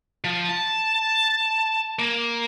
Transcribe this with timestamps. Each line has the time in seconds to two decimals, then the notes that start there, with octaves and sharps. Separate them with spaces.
0.24 F3
0.49 A5
1.99 A#3